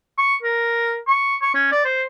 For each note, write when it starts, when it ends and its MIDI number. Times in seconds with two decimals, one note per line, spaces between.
0.18 0.35 85
0.43 0.97 70
1.07 1.36 85
1.42 1.51 85
1.54 1.69 61
1.72 1.80 74
1.85 2.03 72